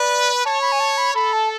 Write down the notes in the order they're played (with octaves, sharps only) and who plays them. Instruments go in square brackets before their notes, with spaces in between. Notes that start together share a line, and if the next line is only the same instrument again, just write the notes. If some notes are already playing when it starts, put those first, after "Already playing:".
Already playing: [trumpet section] B4 [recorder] D5
[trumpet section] C#5 [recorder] A5
[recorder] B5
G#5
A5
B5
[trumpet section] A4 [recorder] B5
[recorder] A5